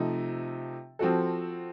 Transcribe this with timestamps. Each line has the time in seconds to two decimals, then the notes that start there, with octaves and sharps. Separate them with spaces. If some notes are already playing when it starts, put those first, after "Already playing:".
Already playing: C3 F3 A3 D#4
0.99 F3 C4 F#4 A4